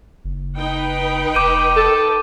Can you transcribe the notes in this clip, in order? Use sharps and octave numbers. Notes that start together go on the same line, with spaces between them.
F#1
D#4 B4 G5
F1 D6 G6 D#7
A4